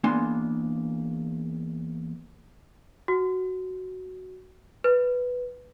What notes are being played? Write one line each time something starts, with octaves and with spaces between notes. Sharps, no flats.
E2 A#3 B3 D4 G#5 C6
F#4
B4